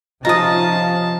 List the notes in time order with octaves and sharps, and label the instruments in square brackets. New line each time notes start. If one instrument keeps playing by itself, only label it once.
[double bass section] C3 F3 C#4 [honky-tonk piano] D#4 F4 [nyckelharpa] A5 [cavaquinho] A#5 D#6